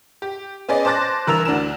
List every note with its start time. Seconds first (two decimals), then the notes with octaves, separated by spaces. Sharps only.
0.22 G4
0.69 B3 C#4 G#4 D5 D#5
0.85 C5 A5 D6 F#6 A6 A#6
1.27 G2 E3 A#4 E6 F7
1.45 D2 D4 A#4 E7